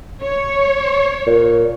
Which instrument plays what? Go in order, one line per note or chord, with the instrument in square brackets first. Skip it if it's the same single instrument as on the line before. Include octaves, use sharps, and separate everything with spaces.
[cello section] C#5
[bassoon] A#2